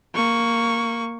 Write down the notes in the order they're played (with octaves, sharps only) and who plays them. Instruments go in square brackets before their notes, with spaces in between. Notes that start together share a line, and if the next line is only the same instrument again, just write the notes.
[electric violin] A#3 C#6